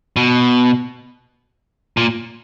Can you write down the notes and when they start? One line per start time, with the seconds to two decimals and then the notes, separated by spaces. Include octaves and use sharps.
0.16 B2
1.97 A#2